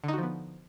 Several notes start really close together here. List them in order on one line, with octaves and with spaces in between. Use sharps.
D3 D#4 F#4 F3 B3